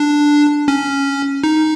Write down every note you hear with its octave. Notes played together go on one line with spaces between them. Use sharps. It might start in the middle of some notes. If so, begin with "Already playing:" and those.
Already playing: D4
C#4
D#4